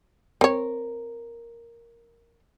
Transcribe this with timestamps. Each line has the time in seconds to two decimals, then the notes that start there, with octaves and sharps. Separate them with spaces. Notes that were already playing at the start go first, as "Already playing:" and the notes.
0.41 C4 A#4 C#5